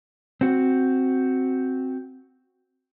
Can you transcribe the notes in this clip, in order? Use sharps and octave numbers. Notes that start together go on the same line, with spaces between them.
C4 F#4